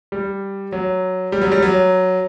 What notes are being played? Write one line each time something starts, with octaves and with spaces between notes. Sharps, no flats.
G3
F#3
G3
F#3
G3
F#3